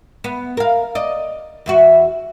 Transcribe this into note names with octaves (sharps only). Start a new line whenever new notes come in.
B3
A#4 F5
D5 D#5
E2 E4 F#4